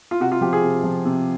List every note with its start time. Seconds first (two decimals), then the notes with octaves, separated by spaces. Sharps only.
0.11 F4
0.20 C3 F#4
0.32 F4
0.41 F3 G4
0.53 G#4
0.63 C3
0.84 F3
1.05 C3